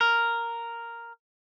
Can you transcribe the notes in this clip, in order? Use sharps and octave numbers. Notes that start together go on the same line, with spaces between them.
A#4